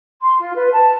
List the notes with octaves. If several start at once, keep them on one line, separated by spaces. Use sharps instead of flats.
C6
F4
B4
A5